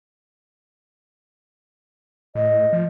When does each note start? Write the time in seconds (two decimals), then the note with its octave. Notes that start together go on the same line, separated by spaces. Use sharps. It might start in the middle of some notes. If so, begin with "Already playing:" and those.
2.35 A2 D#5
2.73 F3